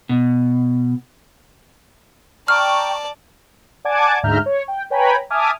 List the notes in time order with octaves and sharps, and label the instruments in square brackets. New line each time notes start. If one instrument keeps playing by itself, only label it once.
[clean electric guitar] B2
[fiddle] D5 A5 [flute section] G5 A#5 C#6 [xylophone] F6
[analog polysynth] D5 F#5 G#5 A5 D6 G#6
D2 G#2 E5 A#5 F6 G6
C#5
G5
B4 C#5 G5 G#5 A#5 B5
E5 G#5 A5 D6 D#6 F6